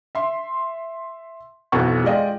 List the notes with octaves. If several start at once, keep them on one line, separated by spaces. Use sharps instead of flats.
E5 C6
B1 F2 B2 E3 F#5 C#6
G#3 F4 D5 D#5 G5